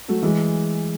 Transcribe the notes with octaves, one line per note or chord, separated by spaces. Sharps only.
F#3 A3
E3 G#3